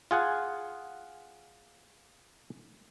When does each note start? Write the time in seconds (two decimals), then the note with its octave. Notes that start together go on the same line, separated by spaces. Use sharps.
0.11 F4 G#4 F#5 G#5